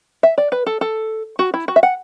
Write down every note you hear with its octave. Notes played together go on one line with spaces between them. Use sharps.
E5
D5
B4
A4
A4
F#4
E4
F#4
E5
F#5